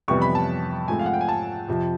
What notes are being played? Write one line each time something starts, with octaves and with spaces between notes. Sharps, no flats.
F2 C3 E3 G3 B3 C#6
B5
A5
G#2 F3 A3 C4 G#5
F5
F#5
G5
G#5
A5
F2 C3 F3